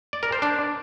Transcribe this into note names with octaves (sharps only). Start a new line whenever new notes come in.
D5
A#4
C5
D4